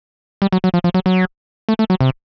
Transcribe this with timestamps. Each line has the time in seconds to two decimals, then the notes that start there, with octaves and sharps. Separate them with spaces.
0.42 G3
0.52 F#3
0.64 F#3
0.74 F3
0.84 F3
0.94 F#3
1.06 F#3
1.69 A3
1.79 A3
1.90 F#3
2.01 C3